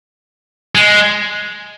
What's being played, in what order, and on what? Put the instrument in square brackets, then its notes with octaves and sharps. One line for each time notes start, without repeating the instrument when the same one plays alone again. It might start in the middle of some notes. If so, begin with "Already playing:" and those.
[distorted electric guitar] G#3